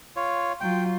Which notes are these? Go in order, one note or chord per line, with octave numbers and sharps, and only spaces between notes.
F4 C#5
F#3 F4 G5